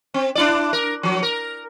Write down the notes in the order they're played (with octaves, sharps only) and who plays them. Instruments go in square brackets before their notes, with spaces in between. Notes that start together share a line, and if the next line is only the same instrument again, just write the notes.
[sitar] C4
D4 E4 D5
A#4
F3 F#3
A#4